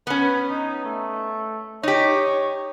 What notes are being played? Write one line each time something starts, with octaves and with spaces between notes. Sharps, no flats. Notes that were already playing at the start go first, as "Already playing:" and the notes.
B3 C#4 B4
D#4
A3
D#4 G4 C#5